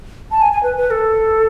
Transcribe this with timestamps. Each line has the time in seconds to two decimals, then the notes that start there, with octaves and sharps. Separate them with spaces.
0.31 A5
0.42 G#5
0.52 G#5
0.63 B4
0.77 B4
0.91 A4